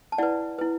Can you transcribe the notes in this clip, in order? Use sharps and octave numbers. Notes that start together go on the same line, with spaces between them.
A5
E4 B4 D5 F#5
E4 B4